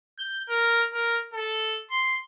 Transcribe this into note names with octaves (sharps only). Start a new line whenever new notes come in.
G6
A#4
A#4
A4
C6